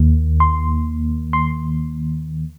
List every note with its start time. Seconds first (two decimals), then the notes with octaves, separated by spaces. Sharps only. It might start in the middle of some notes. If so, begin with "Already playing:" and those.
Already playing: D#2 D#3 A#3
0.40 C6
1.33 C6